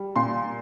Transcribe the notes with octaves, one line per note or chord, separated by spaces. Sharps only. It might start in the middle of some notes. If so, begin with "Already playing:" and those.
Already playing: G3
A#2 C6